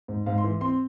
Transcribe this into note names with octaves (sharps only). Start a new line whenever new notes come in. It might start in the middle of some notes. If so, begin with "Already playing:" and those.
G#2
G#2 F5
C6
E3
C4 C6